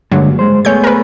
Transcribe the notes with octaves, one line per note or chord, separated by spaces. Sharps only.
G2 D3 F#3 G#3 A#3
G#3 C5
A3 B3 G#4 C#5 G6
A#4 B4